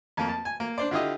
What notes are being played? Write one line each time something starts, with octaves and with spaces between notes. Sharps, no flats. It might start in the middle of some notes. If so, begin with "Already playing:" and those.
F2 A#3
A5
G#5
A#3
D4 C5 D5
D3 E4 F4 G4 D#5